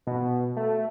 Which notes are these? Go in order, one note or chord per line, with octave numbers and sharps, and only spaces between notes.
B2
A3